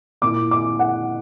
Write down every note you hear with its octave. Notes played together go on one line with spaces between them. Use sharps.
A#2 A#3 E4 D6
D6
F#5